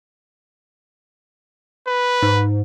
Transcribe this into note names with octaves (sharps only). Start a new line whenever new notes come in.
B4
G#2